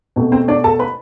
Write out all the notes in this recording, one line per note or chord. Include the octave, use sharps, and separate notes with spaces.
B2 A3 C4
C4 C5
D4 D5
A4 A5
B4 B5